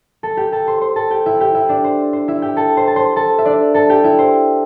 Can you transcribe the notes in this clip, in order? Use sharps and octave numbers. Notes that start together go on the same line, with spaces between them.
A4 A5
G4 G5
A4 A5
C5 C6
C5 C6
A4 A5
G4 G5
E4 E5
G4 G5
E4 E5
D4 D5
C5
C5
E4 E5
G4 G5
A4 A5
C5 C6
A5
C5 C6
A4 A5
E5
D4 D5
A4 A5
G4 G5
E4 E5
C5